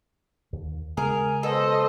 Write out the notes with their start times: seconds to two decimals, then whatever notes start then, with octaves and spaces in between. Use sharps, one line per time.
0.53 D#2
0.97 C#3 G#3 G#4 A#4
1.43 B2 A4 C5 D#5